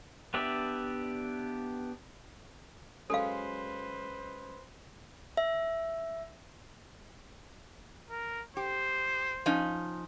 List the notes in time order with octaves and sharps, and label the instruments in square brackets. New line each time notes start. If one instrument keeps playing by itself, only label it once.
[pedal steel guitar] B3 D4 G4 D5 E5
[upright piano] F#3 G#3 C#4 [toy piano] A4 F5 [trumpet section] B4 C5
[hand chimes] E5
[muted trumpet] A#4
[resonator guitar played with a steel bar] G4 [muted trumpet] C5
[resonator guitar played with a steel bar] F3 C#4 D#4